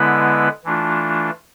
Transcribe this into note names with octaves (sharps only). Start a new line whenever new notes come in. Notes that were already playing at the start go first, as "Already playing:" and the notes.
Already playing: D3 G#3 B3 E4 B4
E3 A3 D4 F4